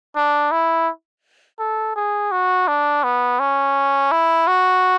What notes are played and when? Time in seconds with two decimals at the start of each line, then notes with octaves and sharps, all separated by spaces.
0.16 D4
0.51 E4
1.59 A4
1.96 G#4
2.32 F#4
2.68 D4
3.04 B3
3.40 C#4
4.11 E4
4.47 F#4